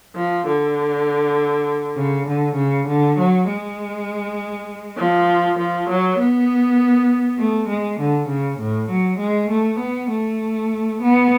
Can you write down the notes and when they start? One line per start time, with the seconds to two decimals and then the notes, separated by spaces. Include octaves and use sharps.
0.16 F3
0.47 D3
1.97 C#3
2.27 D3
2.57 C#3
2.88 D3
3.18 F#3
3.48 G#3
4.98 F3
5.58 F3
5.89 F#3
6.19 B3
7.39 A3
7.70 G#3
7.99 D3
8.29 C#3
8.60 A2
8.90 F#3
9.20 G#3
9.50 A3
9.80 B3
10.10 A3
11.02 B3